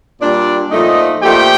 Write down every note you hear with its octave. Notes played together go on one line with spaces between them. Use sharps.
A#2 G3 D4 D5
A#2 F3 A3 D#4 D#5
A#2 F3 A3 G4 G5